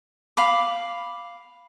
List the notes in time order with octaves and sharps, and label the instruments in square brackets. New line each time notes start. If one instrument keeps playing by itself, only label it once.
[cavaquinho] F5 B5 D6